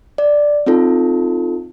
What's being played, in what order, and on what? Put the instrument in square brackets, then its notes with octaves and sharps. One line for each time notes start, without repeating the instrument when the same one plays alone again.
[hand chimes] D5
C4 D#4 F4 A4